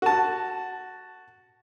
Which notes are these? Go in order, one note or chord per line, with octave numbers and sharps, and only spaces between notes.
F#4 A5